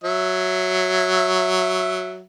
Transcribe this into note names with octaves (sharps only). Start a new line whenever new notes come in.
F#3 E5